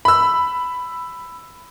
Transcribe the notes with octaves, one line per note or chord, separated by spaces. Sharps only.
B5 E6